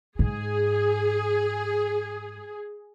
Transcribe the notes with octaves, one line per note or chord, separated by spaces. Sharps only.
G#2 G#4